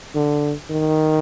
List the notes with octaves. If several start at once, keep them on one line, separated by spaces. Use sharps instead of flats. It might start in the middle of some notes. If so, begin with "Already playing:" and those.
D3
D#3